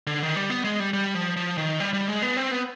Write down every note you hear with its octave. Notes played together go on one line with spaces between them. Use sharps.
D3
D#3
G3
B3
G#3
G3
G3
F3
F3
D#3
G3
G3
G#3
B3
C4
B3